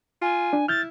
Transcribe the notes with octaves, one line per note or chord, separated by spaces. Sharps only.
F4 G#5
D4
E4 F6 G6 A6